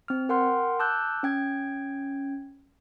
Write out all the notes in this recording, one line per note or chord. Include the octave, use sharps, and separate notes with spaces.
C4 F6
A#4 F#5 G5 C6 F6
A5 D6 E6 F#6 G6
C#4 G5 G#6